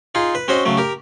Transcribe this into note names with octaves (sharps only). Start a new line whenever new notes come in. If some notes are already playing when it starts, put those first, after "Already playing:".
D#4 F4 G#4
B4
C4 C#4 F#4 C5 D#5
C#3 F#3 A3
G4 A#4